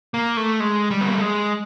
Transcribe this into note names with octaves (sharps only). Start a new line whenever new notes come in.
A#3
A3
G#3
G3
B3
A#3
A3
G#3